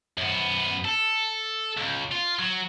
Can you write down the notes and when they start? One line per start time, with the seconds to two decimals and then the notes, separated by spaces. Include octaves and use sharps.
0.18 F#2 B3
0.85 A4
1.77 C#2
2.12 F4
2.39 F#3